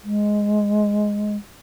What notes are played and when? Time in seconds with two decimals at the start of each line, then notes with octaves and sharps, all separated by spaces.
0.04 G#3